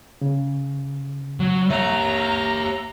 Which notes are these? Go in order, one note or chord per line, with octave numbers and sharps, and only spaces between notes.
C#3
F#3
G4 C#5 E5 A#5